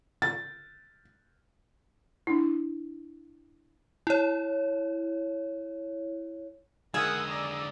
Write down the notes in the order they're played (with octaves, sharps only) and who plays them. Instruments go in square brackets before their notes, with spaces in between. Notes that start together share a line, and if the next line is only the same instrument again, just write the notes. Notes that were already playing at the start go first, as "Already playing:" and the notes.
[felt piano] A6
[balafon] D4 E4
[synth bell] E4 C#5
[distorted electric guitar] D3 G#3 [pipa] D#3 G#4 [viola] A#4 F#5 [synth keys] D#6 E6
[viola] D5 A#5